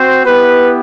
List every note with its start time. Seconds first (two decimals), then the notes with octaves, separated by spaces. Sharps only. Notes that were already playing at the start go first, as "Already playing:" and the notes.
Already playing: C4 F#4 C5
0.25 B3 E4 G4 B4